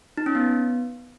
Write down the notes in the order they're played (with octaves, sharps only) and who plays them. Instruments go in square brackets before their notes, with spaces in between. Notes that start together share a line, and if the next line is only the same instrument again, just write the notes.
[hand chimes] D#4
C#4
B3